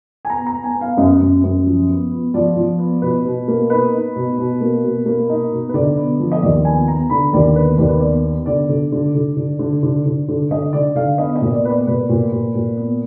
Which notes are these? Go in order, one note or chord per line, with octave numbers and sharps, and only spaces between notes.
G#5
B3 A#5
A#5
B3
G#5
B3
F5
F#2 D#5
F#2
F#2
F3
B3
B3
F3 D5
F3
B3
B2 B4
B2
A#3
D#4 B4
D#4
B2
B2
A#3
B2
A#3
D#4
B2
B4
D3 D5
B3
F3
D#5
D#2 D5
B3 G#5
B3 A#5
D3 B5
D#2 D5
B3 B4
D#2 D5
B4
B3 D5
B3
D3 D5
D3
D3
D3
D3
D3
D3
D3
D3
D3 D#5
D3 D5
D3 F5
B3 D#5
D#5
A#2
D5
B3 B4
D5
A#2 B4
A#2
A#2
A#2
B3